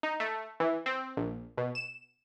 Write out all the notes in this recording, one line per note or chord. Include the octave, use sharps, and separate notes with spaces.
D#4
A3
E3
C4
A#1
B2
E7